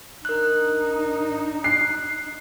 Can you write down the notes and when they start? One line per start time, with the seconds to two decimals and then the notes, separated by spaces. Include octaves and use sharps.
0.25 D4 D#4 A#4 F#6
1.64 F#6 C7